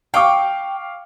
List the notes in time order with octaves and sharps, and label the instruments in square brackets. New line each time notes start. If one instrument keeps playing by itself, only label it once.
[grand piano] F5 C#6 D6 [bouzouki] G5